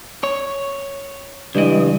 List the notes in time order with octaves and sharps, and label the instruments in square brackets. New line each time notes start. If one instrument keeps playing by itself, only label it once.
[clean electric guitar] C#5
[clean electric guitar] C#2 E3 [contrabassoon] G2 [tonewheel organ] G3 D#5